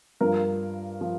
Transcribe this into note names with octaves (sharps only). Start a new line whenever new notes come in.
G2 F3 A#4
F3